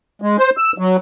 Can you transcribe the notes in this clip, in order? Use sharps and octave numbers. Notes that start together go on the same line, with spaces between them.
G#3
C5
E6
F#3